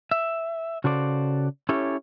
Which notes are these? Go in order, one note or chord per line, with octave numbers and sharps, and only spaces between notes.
E5
C#3 F#4 A4 C5 D5
C#4 E4 G4 A4 C#5